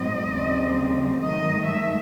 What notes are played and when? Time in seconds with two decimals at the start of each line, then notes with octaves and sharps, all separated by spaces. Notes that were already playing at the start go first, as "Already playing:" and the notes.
Already playing: A2 F#3 C4 D#5
0.32 D#2 C#3 F#3 C4
1.22 G#2 D#3 F#3 A3 D#5
1.67 E5